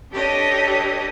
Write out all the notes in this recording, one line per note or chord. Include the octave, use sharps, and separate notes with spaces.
D4 G4 A4 B4 C#5 D#5